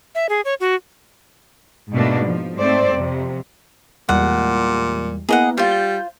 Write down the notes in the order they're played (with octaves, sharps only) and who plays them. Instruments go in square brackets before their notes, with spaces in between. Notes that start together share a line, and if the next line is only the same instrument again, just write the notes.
[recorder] E5
G#4
C#5
F#4
[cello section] G#2 B2 A3 A#3 D4
F3
G#2 A3 C4 C5 D5
F2 C3
[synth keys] E2 G3 G#3 [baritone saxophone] A#2 [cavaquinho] F#5
[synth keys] A#3 B3 E4 [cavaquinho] G#4 D#5 F#5
[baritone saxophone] G3 [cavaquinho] F4 C5
[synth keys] G6